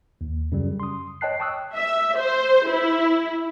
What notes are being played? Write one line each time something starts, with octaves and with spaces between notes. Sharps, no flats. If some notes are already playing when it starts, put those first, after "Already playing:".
D#2
F#2 C#3 G3
C6 D#6
C#5 D#5 G5 A5 F#6 C7
G5 A5 C#6 D#6 E6 F#6
E5
C5
E4